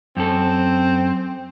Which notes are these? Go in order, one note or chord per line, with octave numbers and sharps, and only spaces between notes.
F#2 C4 A4